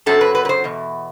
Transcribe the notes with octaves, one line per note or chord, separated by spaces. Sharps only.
F#2 F#3 C4 A4
B4
B4
B4
C5
E2 B2